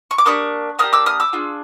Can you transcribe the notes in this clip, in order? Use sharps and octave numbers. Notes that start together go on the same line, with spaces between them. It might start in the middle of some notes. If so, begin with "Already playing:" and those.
C#6
D6
A#3 D4 G4 C#6 D#6
A#3 D4 G4 D#6 F6
D6 E6
D#6 F6
D6 E6
D4 F4 G#4